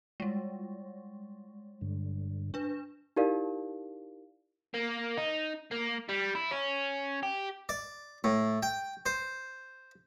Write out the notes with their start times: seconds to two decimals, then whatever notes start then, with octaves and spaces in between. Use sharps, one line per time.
0.20 G3 G#3
1.81 G2 D3
2.54 D4 B4
3.16 D#4 E4 G4 A#4 D5 F5
4.74 A#3
5.17 D#4
5.71 A#3
6.09 G3
6.35 E4
6.51 C#4
7.23 G4
7.69 D5
8.24 A2
8.63 G5
9.06 C5